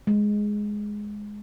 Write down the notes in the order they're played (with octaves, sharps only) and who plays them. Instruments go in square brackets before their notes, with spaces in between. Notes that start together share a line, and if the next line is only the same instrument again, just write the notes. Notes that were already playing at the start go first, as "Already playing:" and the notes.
[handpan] G#3